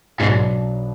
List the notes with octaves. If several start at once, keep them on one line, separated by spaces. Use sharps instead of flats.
B1 G#2 B2 F#3 B3 D4